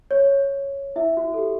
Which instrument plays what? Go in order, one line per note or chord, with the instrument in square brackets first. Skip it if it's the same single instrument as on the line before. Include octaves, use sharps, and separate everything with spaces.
[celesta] C#5
E4 E5
F#4
A4
G4